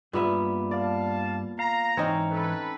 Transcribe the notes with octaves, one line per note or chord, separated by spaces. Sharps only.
G2 A#2 G3 B3 E5
D5 F5 A5
F5 A#5
G#2 E3 C4 C#4 D#4 C#5
A4 B4